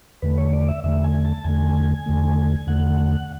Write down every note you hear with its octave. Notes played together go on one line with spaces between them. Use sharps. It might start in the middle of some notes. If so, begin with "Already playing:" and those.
E2 D3 A3 B4
C#5
D5
E5
E2 D3 A3 E5
G#5
A5
E2 D3 A3 G#5
E2 D3 A3
E2 D3 A3 F#5